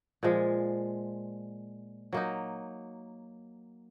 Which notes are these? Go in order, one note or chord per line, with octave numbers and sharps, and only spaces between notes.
A#2 F3 G#3
F#3 A#3 D#4